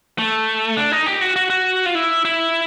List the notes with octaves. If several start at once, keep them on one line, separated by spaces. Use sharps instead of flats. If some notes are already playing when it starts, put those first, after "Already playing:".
A3
D4
D#4
G4
F#4
F#4
F#4
F4
E4
E4